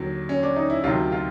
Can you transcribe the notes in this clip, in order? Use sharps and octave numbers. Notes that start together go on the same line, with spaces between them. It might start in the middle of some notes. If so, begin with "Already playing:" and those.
Already playing: D#2 D3 F#3
C#4
D4
D#4
E4
D2 C3 D#3 F#3 F4
F4